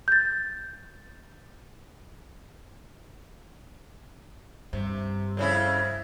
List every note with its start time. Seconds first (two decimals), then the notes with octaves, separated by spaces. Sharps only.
0.08 G6 A6
4.73 G2 C3
5.37 F2 C#3 E4